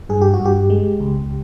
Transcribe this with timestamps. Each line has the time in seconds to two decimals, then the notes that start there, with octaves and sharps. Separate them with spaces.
0.09 G2 G#4
0.21 G4
0.34 F#4
0.39 G2
0.46 G4
0.70 G#3
1.00 C#2